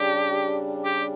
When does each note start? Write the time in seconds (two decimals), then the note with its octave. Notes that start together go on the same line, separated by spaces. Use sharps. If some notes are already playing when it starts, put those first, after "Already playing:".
Already playing: C#3 G3 D4 G4
0.85 G4